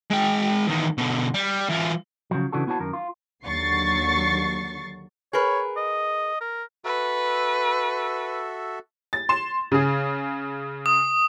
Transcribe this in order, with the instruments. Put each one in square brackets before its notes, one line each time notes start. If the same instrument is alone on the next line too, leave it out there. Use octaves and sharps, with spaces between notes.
[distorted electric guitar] G#3 G5
E2 D#3
B2 D3
G3
E3 F4
[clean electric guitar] C#3 F3 F#3
C#3 E3 D4 F#4 A4
B3 E4 F#4 C#5 A5
F#2 D#3 A#4
F4
[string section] D#2 D3 F#3 C#6 A6 C7
[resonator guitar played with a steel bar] G#4 A#4 B4 [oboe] C#5
[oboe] D#5
A#4
[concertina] F#4 A4 E5 [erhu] B4
[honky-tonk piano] A6
C6 E7
C#3 G#4
[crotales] D#6